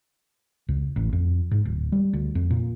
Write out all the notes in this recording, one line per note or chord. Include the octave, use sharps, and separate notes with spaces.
C#2
A1
F2
G#2
D1
G3
D2
F2
A#2